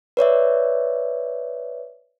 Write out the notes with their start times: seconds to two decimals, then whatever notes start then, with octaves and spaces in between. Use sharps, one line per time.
0.17 B4 C#5 D5 E5